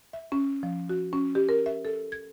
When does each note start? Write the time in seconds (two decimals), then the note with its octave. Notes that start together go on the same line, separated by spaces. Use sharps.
0.13 E5
0.32 C#4
0.63 F3
0.89 F#4
1.13 C#4
1.35 G4
1.49 A#4
1.66 E5
1.85 A4
2.12 G#6